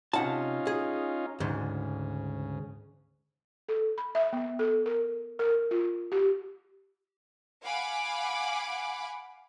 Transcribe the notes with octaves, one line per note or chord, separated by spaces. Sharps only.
C3 C#4 D#4 F4 F#5 A5
G#4
D2 G#2 C#3
A4
B5
E5
B3
A4
A#4
A#4
F4
G4
F5 F#5 G#5 B5 D6